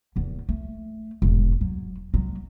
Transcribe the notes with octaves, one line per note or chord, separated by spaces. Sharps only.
D1 E2
A3
E1 G#2
F#3
F#3 G#3